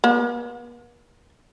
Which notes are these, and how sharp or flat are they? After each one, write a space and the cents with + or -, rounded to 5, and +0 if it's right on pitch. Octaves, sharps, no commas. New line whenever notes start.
B3 -45